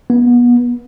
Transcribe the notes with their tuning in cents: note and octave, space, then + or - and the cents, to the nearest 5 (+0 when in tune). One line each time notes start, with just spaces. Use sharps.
B3 -30